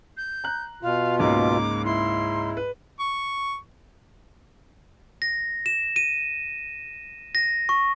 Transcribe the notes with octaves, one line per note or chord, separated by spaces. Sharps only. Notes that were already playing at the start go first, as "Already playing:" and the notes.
G6
A#5 F#6
B2 F4 F5
C#2 G#2 A#3 D6
E4 C6
B4
C#6
A#6
E7
D#7
A#6
C#6